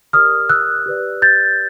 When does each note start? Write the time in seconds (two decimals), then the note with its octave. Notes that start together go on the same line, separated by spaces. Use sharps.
0.13 G4 A#4 D5 D#6 F6
0.49 E6 F#6
0.86 G4 B4 D5
1.22 G6 A6